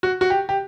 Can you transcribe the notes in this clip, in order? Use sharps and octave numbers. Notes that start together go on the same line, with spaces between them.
F#4
F#4
G4
G4